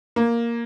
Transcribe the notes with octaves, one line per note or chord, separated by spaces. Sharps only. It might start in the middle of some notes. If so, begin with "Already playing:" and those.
A#3